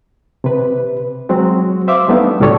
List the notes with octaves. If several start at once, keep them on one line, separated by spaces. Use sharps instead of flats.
C3 B4
F#3 G#3 C4 F#4
C5 E5 F5 D6
G3 A3 B3 D4 D#4
C#2 A2 G3 F#4 A4 C#5